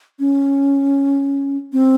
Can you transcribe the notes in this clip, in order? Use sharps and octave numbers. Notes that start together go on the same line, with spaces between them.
C#4
C4